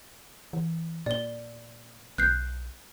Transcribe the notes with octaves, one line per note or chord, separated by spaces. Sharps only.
E3
A#2 D5 G7
B1 F#6 G6 C7